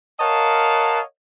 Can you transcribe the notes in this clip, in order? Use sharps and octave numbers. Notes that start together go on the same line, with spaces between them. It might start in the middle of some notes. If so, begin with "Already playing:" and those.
A#4 C#5 D#5 F5 F#5 A5